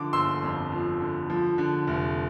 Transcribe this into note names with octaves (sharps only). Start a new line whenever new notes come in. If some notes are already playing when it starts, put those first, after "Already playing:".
Already playing: D3 F3 D6
G1 C6 E6
F2
F3
D3
F3
D3
F1